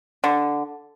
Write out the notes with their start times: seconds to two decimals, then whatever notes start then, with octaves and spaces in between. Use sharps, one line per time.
0.24 D3